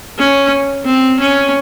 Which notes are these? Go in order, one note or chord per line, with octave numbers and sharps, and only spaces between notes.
C#4
C4
C#4